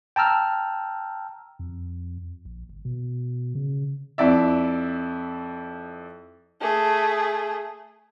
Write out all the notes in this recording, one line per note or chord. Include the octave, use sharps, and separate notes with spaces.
G5 A5 A#5 E6 F6
F2
A#1
G1
B2
C#3
F2 E4 D5 E5
A3 G#4